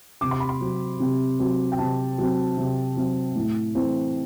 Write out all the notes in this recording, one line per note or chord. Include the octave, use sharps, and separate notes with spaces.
C3 D6
C6
B5
C6
F#3 C4
C3
F#3 C4
G5
C3 A5
F#3 C4
C3
F#3 C4
A2
E3 A3 C4